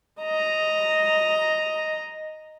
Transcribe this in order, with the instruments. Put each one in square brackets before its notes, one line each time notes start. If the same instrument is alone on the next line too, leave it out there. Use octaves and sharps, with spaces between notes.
[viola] D#5 A#5